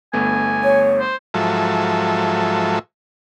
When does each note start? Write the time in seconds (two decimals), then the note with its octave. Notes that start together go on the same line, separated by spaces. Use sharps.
0.13 G1 A3 B3 G#5
0.64 C#5
1.00 C5
1.34 G#2 F3 F#3 A4 E5